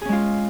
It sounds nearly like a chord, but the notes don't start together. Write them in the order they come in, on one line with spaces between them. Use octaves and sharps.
G#4 C#4 G#3 F4